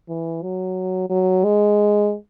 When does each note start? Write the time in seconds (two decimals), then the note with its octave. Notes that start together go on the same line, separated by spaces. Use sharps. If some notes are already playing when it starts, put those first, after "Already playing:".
0.09 E3
0.43 F#3
1.10 F#3
1.45 G#3